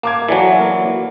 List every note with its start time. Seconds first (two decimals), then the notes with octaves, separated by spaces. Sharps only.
0.03 A#3 A5 D6 G#6
0.28 E3 F#3 A4 D5 G#5
0.60 A#3